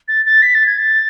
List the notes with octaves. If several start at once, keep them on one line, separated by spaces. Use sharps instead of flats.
A6
A6
B6
A6
G#6
A6